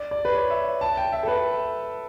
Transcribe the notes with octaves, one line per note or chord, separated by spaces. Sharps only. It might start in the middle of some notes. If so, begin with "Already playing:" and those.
Already playing: D5
D5
B4
C#5
E5
A5
G5
E5
A4
B4